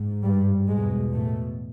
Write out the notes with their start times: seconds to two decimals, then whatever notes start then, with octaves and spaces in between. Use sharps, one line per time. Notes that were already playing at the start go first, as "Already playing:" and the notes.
Already playing: G#2
0.23 G2 G3
0.68 E2 G#2 B2 G#3
1.13 A2 A3